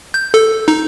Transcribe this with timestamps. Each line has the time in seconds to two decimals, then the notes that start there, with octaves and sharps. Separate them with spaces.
0.14 G6
0.34 A4
0.68 D#4